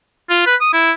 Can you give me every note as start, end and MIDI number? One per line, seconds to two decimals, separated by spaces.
0.29 0.43 65
0.46 0.56 71
0.61 0.69 87
0.73 0.92 64